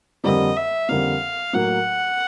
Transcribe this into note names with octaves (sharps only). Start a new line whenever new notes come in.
F2 D3 G3 A#3 D#5
E5
F2 D3 G3 A#3 F5
A2 F#3 A#3 F#5